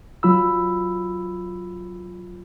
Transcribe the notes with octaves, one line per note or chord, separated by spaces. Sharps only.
F#3 F4 B5 E6